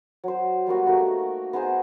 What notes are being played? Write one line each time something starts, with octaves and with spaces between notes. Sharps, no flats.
F#3 C5
G3 A#3 B3 F#4
A3 A#3 D#4 F#4
B3 D#4 G#4 C5